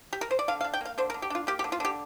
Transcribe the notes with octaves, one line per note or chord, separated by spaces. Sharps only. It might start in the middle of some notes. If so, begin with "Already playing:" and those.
G4
A#4
C5
D5
D3 F5
F5
D4
G5
A#3 F5
D3 C5
A#4
D3
G4
D4 F4
A#3 G4
G4
D3
F4
D3 G4